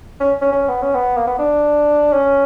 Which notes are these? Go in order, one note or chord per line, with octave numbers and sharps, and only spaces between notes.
C#4
C#4
C#4
B3
C#4
B3
A#3
B3
D4
C#4